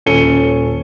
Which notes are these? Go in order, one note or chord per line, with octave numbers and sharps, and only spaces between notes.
D#1 C#4 A4 C#7 D#7 G7